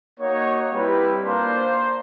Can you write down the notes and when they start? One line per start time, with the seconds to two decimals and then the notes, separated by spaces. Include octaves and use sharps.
0.19 A#3 D#4 F#4 C#5
0.72 G3 C4 E4 G4 B4
1.23 A#3 D4 F4 C5